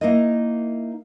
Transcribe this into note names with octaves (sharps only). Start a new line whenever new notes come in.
A#3 D#4 E4 A#4 D#5